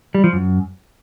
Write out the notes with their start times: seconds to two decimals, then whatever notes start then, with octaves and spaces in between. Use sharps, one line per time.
0.15 G3
0.24 F3
0.33 F#2